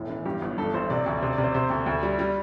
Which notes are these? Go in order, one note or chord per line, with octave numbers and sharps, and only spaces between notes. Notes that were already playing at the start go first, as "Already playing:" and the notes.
Already playing: E1 A2
E3
G2 G4
G1
G2 A4
A1 C5
C3 D5
D2
C3 C5
D5
C3
C5
C3 C5
D2
D2
G3
G3